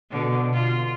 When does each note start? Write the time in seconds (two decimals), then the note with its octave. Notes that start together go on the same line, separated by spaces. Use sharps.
0.11 B2 D3
0.52 F4